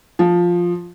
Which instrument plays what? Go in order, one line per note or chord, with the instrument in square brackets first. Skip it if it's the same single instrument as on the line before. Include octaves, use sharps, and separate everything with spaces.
[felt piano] F3